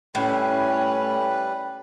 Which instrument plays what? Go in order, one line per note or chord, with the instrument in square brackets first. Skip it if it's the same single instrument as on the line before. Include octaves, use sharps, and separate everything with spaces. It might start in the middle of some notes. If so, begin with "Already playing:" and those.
[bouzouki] A2 [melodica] G3 B4 [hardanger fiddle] C#4